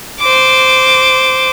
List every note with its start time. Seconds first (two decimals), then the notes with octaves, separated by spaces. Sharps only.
0.20 C5 D6